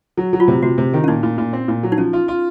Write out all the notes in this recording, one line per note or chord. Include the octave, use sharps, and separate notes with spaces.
F#3
F#3
F4
C3
C3 F#4
C3
D#3
C#4
A#2 D#4
A#2
A#2
C4
A#2
F#3
D#4
F3 C#4
F4
F4